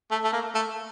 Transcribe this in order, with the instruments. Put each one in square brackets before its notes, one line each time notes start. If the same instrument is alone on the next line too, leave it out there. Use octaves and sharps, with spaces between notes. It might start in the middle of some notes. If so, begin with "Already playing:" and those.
[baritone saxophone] A3
A3
A#3
A3